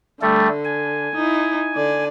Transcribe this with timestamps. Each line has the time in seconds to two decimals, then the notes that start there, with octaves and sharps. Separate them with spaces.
0.22 D3 G3 A3 A4
0.65 G#5
1.16 D#4 E4
1.76 D3 D5